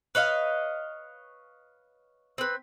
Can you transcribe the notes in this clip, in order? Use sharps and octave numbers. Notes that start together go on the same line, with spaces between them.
B4 C#5 D#5 F5
C4 B4